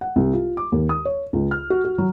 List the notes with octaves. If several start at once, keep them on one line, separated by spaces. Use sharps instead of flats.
F#5
C2
F4
D6
D#2
D#6
C#5
C#2
F6
F#4
F#4
F#3